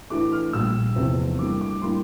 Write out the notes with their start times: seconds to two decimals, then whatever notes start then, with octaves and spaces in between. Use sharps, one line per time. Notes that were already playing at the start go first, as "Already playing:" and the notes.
0.10 A2 E3 A3 D4 D6
0.32 F6
0.53 A#1 A#2 G3 E6
0.96 F1 E2 C3 F3 C4
1.39 A2 G3 A#3 D4 D6
1.61 D6
1.82 A2 G3 A#3 D4 C6